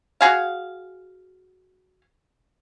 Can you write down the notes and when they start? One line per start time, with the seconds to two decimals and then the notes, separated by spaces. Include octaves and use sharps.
0.21 F#4 G#4 F5